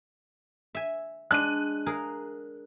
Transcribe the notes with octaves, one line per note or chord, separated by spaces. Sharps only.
E5 G#5
G#3 D4 F#6 D#7
G#4 A#4 F5